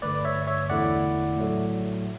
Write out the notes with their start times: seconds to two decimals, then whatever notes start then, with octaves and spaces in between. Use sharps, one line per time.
0.02 G2 D3 A3 B4 D5
0.25 C#5 E5
0.47 C#5 E5
0.69 E2 D3 A3 E4 D5 F#5
1.37 A2 F#3 A3